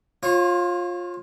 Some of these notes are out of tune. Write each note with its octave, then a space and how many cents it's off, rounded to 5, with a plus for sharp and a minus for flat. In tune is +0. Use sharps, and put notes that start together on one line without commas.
F4 +15 C#5 -35